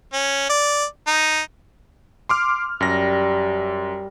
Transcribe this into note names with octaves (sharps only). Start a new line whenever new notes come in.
C#4
D5
D#4
C6 D6 F6
F#2 G3 A#6